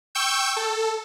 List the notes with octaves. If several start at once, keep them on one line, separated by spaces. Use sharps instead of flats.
G5 C#6 E6 G6
A4